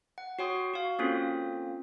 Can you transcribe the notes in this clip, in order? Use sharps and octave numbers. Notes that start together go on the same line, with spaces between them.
F#5
F#4 C#5 G5 C6 D#6
F#4 F5
A#3 C4 C#4 F4 A4